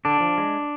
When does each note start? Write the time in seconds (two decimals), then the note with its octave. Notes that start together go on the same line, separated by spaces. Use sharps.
0.05 D3 D4
0.20 F3
0.38 G#3